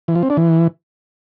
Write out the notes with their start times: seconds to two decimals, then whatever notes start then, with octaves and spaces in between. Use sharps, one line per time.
0.08 E3
0.15 F3
0.23 C4
0.30 D4
0.37 E3